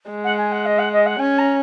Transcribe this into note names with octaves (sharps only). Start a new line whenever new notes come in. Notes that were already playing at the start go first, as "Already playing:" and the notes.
G#3
F#5
G#5
F#5
D#5
F#5
D#5
F#5
C#4 G#5
A#5